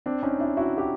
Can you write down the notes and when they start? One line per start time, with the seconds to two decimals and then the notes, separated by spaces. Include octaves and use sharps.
0.06 C4 D4
0.23 C#4 D#4
0.40 D4 E4
0.57 E4 F#4
0.78 G4